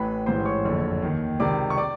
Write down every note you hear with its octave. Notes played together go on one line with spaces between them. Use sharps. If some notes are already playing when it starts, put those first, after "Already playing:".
Already playing: A1 A2 E3 B4 B5
A1 G#2 E3 C5 C6
C#5 C#6
F#1 F2 D3
D#2 D#3
C#2 C3 D#3 D5 D6
C#6
D5 D6